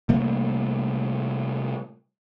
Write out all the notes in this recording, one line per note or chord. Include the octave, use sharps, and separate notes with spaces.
C3 G3 A3 A#3